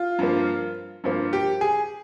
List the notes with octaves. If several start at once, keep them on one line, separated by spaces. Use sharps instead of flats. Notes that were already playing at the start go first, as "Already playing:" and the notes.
Already playing: F4
G2 F3 A#3
G2 F3 A#3
G4
G#4